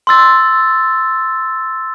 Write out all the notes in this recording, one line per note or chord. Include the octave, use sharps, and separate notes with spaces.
C6 E6 A6